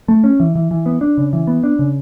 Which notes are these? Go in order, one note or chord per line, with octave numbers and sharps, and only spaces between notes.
A3
C#4
E3
E3
E3
B3
D4
C#3
E3
B3
D4
C#3